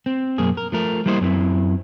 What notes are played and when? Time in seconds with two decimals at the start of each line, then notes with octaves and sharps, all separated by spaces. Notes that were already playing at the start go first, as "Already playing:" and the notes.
0.06 C4
0.38 B1 F#2 A#3 G#4
0.57 A#4
0.72 F3 A3 A#4
1.06 G3 A#3 E4 C5 C#5 D#5
1.21 F#2 C4 E4